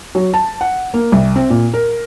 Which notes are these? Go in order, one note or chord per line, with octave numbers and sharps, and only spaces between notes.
F#3
A5
F#5
A#3
C2
C4
A#2
A#4